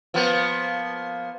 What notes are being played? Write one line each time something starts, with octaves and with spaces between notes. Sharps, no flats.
F3 A#3 B3